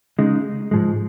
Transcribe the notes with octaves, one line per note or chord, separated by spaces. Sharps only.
C#3 G#3 D#4
G#2 F3 G#3